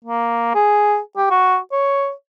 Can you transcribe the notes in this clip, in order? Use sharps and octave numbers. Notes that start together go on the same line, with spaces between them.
A#3
G#4
G4
F#4
C#5